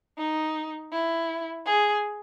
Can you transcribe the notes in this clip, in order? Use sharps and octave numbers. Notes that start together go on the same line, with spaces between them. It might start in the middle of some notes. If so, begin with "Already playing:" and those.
D#4
E4
G#4